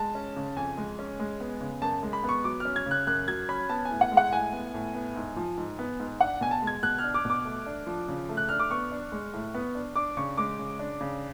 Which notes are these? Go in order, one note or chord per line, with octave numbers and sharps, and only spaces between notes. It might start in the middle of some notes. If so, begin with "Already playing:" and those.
Already playing: G#3 A5
C#4
C#3
F2 G#5
G#3
C#4
G#3
B3
C#3
F#2 A5
G#3
B5
B3 C#6
F#3 D6
C#4 F6
G#6
C#3 F#6
F#2 F#6
F#3 G#6
C#4 B5
B3 A5
G#5
A2
F#5
G#3
F#5
A2 G#5
B3
A2
B3
G#2
F3
G#2
B3
G#2
D4 F#5
B2 G#5
A5
G#3
G#6
B2 F#6
F6
D4
D6
B2 D6
A3
D4
F3
C#3
A3
F#6
D4 F6
D6
B3 C#6
D4
G#3
A2
B3
D4
D4 D6
C#3 C#6
G#3 D6
C#3
D4
C#3